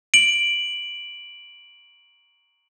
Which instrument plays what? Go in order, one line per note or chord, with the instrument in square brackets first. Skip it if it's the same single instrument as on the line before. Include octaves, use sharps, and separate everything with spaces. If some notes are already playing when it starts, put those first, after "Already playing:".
[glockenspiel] D7 F#7